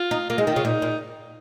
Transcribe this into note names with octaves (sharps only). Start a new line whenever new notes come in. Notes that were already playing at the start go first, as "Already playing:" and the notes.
Already playing: F4
D#4
A#3 F4
G#3
D#4
D#3
C#3 F4
A#2 D#4
A#2